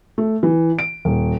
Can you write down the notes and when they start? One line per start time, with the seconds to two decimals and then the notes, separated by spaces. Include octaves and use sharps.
0.18 A3
0.43 E3
0.79 D7
1.05 D#1